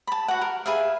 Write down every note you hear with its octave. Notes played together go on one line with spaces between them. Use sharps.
A5 B5
F#4 F#5
A#4
G#4 B4 E5 F5